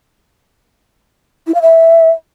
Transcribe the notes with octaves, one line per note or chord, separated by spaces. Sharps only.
E4
F5
E5